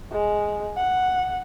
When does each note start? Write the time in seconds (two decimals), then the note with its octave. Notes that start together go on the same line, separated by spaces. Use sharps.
0.11 G#3
0.77 F#5